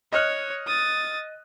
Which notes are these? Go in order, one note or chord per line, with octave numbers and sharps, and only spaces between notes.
C#5 D#5 F6 F#6
D#6 A6